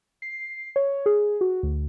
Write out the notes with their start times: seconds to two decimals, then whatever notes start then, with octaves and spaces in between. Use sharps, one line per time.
0.22 C7
0.76 C#5
1.06 G#4
1.41 F#4
1.63 D2